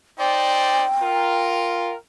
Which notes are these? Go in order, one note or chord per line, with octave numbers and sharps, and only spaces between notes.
D#4 C5 D5 G5
F4 A#4